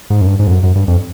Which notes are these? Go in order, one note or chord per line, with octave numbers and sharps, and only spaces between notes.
G#2
F#2
G2
G#2
F2
F#2
F#2
G2
F2